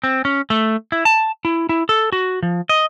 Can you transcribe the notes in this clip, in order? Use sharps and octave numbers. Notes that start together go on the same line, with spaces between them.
C4
C#4
A3
E4
A5
E4
E4
A4
F#4
F3
D#5